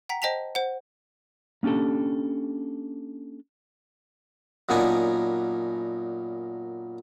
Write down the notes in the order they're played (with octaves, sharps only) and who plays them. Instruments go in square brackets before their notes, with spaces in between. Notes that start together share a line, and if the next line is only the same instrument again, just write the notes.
[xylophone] F#5 G5 A#5 B6
C5 D#5 G5 A5 B6 F7
C5 F#5
[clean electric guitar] A#3 C#4 D4 G4 A4
[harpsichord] F#2 A#2 B3 D4 D#4 G#5